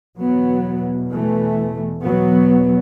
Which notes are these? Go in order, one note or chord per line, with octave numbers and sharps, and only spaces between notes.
E2 B2 F#3 B3
E3 A3
E2 B2 F#3 B3